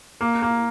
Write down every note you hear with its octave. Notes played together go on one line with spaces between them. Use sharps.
A#3
A#3